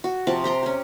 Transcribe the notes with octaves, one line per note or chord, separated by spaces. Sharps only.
F#4
C3 F3 A5
G4 A#5 C6
C#4 G4